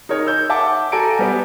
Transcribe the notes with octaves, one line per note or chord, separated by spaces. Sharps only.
D#4 G#4 A#4 C#5
E6 G6
E5 F#5 A5 D6
F#4 A4 F#5 G#5 A#5 D7
G3 B3